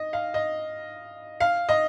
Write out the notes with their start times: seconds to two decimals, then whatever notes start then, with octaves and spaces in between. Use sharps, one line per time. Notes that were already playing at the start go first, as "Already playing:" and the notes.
Already playing: D#5
0.13 F5
0.34 D#5
1.40 F5
1.69 D#5